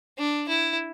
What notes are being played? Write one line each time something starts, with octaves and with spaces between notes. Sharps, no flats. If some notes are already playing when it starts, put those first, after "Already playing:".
D4
E4